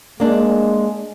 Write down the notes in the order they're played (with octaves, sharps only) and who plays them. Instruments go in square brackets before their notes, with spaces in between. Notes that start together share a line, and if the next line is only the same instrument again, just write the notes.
[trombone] G#3 [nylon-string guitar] A#3 D4